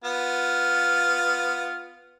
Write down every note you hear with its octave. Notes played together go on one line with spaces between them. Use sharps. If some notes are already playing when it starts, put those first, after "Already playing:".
B3 F4